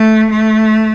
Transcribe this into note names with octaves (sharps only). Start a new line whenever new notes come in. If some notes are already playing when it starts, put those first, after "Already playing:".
Already playing: A3
A3